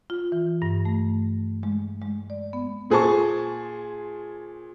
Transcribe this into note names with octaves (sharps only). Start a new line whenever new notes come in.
F4
E3
G2
A3
G#3
G#3
D5
B3
A#2 G#4 C5 A5 C#6